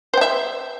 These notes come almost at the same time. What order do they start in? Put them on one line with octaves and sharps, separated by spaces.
C5 G5 E5